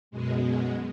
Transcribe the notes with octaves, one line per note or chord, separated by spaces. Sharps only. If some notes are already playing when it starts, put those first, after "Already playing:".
F#2 B2 G#3